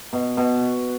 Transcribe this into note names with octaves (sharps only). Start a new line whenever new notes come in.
B2
B2